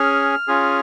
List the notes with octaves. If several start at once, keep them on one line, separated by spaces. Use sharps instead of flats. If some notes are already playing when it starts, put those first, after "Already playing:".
Already playing: C#4 G#4 F6
C#4 F4 G#4